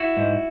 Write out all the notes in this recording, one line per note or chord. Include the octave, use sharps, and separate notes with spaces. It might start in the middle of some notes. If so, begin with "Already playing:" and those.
Already playing: E4 F#4
G#2